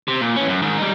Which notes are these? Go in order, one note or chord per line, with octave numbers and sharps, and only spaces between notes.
C3
A#2
E3 C#4
F#2
G#2 D#3
G3 D#4